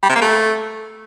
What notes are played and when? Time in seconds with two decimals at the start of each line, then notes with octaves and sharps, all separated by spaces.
0.03 G3
0.09 C3
0.15 A#3
0.22 A3